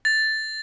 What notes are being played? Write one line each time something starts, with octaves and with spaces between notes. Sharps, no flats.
A6